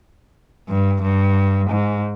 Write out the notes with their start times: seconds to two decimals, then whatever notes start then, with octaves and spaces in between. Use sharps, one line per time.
0.68 G2
1.01 G2
1.69 G#2